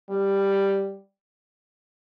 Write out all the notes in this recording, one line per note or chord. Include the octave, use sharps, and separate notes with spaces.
G3